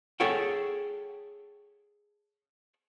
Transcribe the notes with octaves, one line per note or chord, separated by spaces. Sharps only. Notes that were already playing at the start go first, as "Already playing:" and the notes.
G#4 A4 C#5 F#5 G5